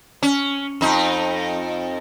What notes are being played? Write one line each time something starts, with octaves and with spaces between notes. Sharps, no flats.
C#4
F2 D#4